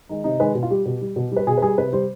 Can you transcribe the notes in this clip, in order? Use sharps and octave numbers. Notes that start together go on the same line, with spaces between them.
D#3 G#3 D#4
C3 D#4
D#3 G#3 B4
B2
F4
G3 G4
B2
G3
B2
G3
B4
B2 G#4
B4
G3 G#4
C3 B4
G3 C5